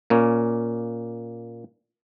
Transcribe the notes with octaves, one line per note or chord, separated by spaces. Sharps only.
A#2 A#3 C#4